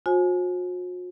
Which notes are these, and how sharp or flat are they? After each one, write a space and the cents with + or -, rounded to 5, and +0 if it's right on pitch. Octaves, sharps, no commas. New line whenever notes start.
F#4 -45 C5 +35 G#5 +25